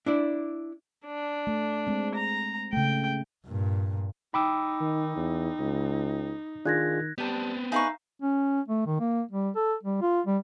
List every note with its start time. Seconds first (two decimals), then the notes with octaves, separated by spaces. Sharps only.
0.06 D4 E4 D5
1.06 D4
1.47 A3
1.87 G#3 C4
2.15 A#5
2.73 C#3 A3 G5
3.46 G2 A#2
4.34 D#4 G5 B5 D6 E6
4.80 D#3
5.16 E2
5.59 C#2
6.65 D#3 D4 F4 G#4 F#6 G#6 A#6
7.18 G3 B3 C4 A5
7.72 D#4 G#4 B4 E5 F5 C#6
8.22 C#4
8.68 A3
8.86 D#3
9.00 A#3
9.31 G3
9.56 A4
9.83 G3
10.01 F4
10.26 G3